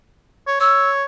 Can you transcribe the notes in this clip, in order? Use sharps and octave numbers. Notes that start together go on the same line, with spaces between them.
C#5
C#5 E6